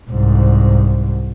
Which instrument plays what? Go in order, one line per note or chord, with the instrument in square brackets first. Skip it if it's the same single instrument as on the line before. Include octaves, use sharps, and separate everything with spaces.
[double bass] C2 G#2